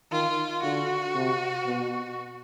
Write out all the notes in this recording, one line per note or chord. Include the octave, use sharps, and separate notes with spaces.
D#3 F4
D3 F#4
C3
B2